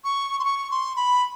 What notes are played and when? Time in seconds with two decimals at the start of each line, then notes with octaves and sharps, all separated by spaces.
0.04 C#6
0.39 C6
0.45 C#6
0.71 C6
0.96 B5